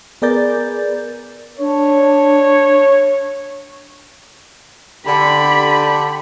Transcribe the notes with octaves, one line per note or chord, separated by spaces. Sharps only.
B3 G#4 A#4 D5 G6 A6
D4 C#5
D3 G4 B5